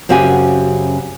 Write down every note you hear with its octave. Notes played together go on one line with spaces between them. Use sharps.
F#2 C#3 C4 F#4 G4 G#5